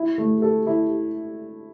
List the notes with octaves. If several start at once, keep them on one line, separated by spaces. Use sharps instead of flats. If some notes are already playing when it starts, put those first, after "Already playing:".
Already playing: E4
A3
A4
E4